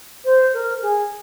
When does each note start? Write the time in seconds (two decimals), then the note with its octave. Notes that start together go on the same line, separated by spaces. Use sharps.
0.24 C5
0.53 A#4
0.82 G#4